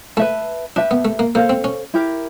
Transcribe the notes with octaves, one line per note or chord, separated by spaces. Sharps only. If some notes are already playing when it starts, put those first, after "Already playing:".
A3 B4 E5 A5
D4 G4 B4 E5 A5
B3
A3
A#3
A#3 A4 C5 F5
C4
C#4
E4 G4 A#4